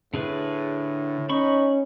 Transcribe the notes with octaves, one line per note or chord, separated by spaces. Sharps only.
A2 D3 G#4 B4
C#4 D#4 B5 C#6